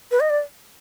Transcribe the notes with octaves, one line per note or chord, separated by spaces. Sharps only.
B4
D#5
D5